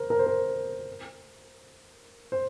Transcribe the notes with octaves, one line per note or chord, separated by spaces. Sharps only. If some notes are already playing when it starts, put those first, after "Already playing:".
Already playing: A#4 C5
A#4
C5
A#4
C5